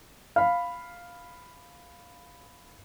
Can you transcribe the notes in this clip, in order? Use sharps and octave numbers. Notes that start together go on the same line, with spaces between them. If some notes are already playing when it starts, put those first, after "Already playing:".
F5 B5